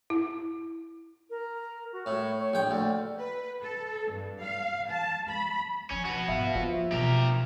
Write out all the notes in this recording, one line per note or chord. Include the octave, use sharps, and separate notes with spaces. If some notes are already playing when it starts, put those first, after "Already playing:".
E4
A#4
F#4
A2 C#5
C#5
A#1 G5
D2 D5
B4
A4
G2
F5
A5
B5
E3 F3 C#4
F#4 B4
G#2 B3 E5 F5
F3 A#3 D4 E5
B2 E3 G4 A#4